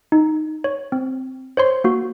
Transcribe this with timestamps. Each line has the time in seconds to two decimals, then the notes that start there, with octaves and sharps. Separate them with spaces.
0.12 D#4
0.64 C#5
0.92 C4
1.57 C5 C#5 C6
1.84 A#3 F#4